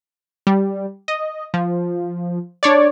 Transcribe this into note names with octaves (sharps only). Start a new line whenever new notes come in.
G3
D#5
F3
D4 C#5 D5